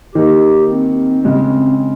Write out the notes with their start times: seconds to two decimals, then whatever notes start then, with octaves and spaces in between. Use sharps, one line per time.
0.15 D#3 A#3 D#4 G4
0.70 C4
1.24 C#3 G#3 C4 C#4